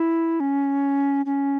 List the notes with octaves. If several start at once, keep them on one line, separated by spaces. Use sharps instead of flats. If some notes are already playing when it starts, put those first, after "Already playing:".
Already playing: E4
C#4
C#4